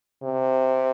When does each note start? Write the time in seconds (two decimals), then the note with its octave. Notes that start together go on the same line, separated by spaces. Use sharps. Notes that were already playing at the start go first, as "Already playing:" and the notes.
0.23 C3